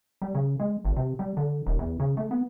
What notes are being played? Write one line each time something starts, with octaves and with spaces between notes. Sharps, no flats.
G3
C#3
G#3
G1
C3
G3
D3
D#1
E2
C#3
A3
B3